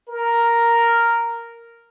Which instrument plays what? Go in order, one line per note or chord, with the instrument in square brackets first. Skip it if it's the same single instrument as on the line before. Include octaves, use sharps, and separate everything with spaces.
[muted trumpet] A#4